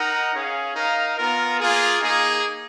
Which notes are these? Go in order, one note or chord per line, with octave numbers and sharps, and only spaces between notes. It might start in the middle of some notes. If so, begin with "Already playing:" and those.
Already playing: D#4 A#4 D#5 F#5
C#4 G#4 C#5 F5
D#4 A#4 F5
B3 F4 A#4
A#3 F4 G#4
A#3 D#4 G#4